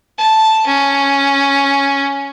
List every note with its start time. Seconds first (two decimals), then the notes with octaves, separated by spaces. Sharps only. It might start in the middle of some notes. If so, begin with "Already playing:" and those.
0.18 A5
0.67 C#4